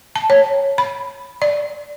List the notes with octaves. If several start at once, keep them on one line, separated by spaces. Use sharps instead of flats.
A5
C#5
B5
D5